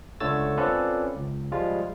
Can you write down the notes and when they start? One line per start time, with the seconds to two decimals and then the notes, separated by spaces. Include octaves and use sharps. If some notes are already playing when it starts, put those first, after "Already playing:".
0.20 C#2 D3 A3 C#5 E6 A6
0.58 C4 C#4 F4 A4 B4 D5
1.17 C#2
1.52 F3 G3 G#3 F4